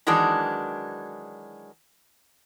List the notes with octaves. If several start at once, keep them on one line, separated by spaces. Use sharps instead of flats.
D#3 E3 F#3 G#3 D4